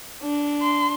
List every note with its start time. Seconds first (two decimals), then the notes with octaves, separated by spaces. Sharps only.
0.22 D4
0.62 C6